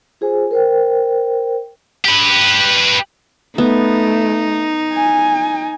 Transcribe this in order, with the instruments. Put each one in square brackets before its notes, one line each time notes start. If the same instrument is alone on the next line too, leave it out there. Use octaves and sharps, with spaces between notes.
[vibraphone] F4 G#4 C5 G#5
A#4 C5 G5
[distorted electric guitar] G4 B4
[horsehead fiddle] A3 [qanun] B3 [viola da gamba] D#4
[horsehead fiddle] G#5